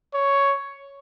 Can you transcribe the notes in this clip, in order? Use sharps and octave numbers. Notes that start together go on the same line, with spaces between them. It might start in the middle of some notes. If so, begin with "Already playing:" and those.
C#5